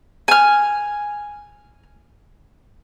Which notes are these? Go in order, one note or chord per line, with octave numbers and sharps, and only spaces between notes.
G#5 F6